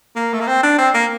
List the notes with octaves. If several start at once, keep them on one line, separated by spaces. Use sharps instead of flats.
A#3
A3
A#3
C4
D4
C4
A#3